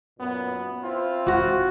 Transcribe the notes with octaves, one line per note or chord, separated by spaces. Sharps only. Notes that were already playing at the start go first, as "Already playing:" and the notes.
F#2 A#2 B3
C4 E4 F4
F#4